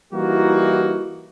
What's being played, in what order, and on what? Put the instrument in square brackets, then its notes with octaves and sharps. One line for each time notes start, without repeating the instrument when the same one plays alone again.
[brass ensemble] E3 G3 A#3 D#4 E4 F#4